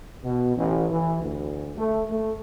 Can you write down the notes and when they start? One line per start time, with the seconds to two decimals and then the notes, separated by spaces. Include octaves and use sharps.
0.25 B2
0.57 A1
0.91 E3
1.22 D2
1.79 A3
2.11 A3